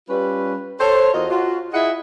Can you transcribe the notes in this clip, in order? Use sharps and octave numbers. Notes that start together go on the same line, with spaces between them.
G3 C#4 F4 B4
A4 C5 C#5
E2 F4 F#4 A#4 D#5
F4 F#4
E4 F4 G#4 D#5 E5 F#5